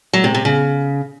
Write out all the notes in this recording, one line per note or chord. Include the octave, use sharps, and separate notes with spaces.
F#3
C3
C3
C#3